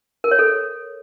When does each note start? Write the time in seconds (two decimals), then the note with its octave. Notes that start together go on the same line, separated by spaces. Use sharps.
0.24 A#4
0.31 C#5
0.39 A4